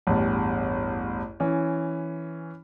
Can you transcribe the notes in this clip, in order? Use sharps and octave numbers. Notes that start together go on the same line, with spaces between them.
A1 E2 G2
E3 C#4